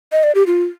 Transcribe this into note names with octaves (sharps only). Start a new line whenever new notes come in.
D#5
D5
G4
F4